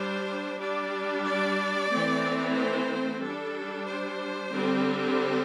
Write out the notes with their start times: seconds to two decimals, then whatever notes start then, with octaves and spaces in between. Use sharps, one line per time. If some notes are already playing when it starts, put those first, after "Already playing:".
Already playing: G3 D4 C5
0.59 G3 D4 D5
1.25 D5
1.91 E3 A3 C4
2.55 C5
3.21 G3 D4 A4
3.87 C5
4.52 D3 G3 C4